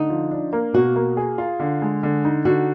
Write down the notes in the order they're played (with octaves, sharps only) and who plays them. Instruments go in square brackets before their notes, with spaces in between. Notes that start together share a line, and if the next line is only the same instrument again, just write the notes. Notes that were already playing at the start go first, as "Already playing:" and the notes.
Already playing: [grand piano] D3 [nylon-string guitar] D#4
[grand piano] F3
D4
A#3
[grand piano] B2 [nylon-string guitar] F#4
[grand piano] A#3
G#4
F4
D3
G#3
D3
D#4
[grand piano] D3 [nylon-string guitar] F#4